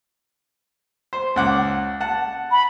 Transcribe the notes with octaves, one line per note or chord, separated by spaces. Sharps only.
C5
C#2 F#5 D6
F#5 A5
B5